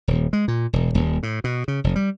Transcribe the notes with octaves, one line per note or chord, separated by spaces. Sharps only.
D#1
G#3
A#2
E1
D#1
A2
B2
C#3
F1
G3